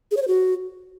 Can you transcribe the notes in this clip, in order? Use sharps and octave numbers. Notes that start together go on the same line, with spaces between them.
G#4
C#5
C5
F#4